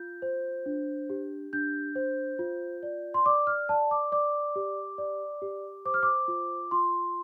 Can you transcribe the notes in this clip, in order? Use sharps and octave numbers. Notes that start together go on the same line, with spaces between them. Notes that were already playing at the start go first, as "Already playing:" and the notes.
Already playing: F4 G6
C5
D4
G4
D4 G6
C5
F4
D5
C6
D5 D6
F6
D5 A5
D6
D5 D6
G4
D5
G4
C5 D6
F6
D6
F4
F4 C6